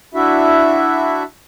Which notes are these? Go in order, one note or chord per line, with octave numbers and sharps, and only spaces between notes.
D4 E4 F#4 E5